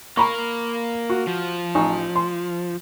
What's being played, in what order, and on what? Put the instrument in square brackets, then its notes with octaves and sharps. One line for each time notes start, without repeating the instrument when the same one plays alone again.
[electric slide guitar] A#3 A#4 [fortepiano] A#5 B5 C#6
[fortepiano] F#4
[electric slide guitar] F3
[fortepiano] A1 D#4 C#6
C6